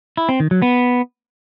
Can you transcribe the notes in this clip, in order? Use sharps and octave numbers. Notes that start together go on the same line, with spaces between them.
E4
C4
D#3
F#3
B3